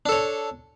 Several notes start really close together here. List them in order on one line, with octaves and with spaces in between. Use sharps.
D4 A4 C#5